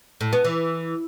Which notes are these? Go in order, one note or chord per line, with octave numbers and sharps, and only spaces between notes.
A2
B3
E3